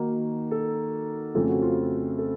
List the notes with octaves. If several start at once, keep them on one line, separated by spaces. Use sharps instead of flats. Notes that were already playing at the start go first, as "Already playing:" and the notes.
Already playing: D#3 A#3 D#4 F#4
A4
F2 C#3 A3 C4 A4
F#4
F4
A4